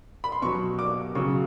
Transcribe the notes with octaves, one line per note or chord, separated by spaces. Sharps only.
B5
C6
B2 F#3 C#6
D6
C#3 F#3 C#6